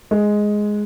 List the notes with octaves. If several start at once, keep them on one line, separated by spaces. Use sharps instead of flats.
G#3